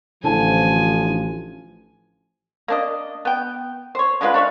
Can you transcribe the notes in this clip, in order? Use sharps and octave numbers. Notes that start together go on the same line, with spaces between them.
A1 D3 F3 E4 G#5 A5
A#3 D4 D#5
B3 G5
C5 C#5
D3 G#3 F4 B4
D4 C#5 E5 F5